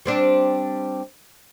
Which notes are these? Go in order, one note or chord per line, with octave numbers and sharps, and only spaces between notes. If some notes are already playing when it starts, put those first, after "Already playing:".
G3 C4 D4